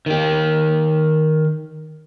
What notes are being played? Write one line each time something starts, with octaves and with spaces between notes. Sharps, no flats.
D#3 G4